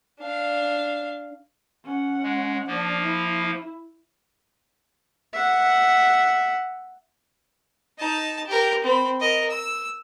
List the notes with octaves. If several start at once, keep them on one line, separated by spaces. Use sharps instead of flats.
D4 F5
C#4 F#5
G#3
F3 A#3 D4
E4
E5 F#5
D#4 A5
G4 A#4
C4 B5
A#4 D#5
E6